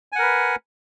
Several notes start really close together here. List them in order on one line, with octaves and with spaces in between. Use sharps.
G#5 F#5 A#4 B4